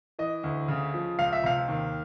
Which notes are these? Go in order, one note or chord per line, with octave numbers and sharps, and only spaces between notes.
E3 D#5
D2
C#3
F3
C#2 F5
E5
C3 F5
D#2